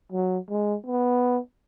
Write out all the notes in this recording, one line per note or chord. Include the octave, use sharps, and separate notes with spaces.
F#3
G#3
B3